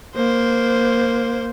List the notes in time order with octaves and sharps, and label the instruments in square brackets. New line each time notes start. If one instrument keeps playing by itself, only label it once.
[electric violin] A#3 C5